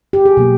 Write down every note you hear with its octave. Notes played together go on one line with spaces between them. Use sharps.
G4
G#4
B2 F#3 A#3